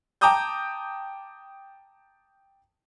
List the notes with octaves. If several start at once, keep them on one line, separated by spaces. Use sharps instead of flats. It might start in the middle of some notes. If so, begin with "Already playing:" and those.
G5 A5 A#5 D6 D#6 G6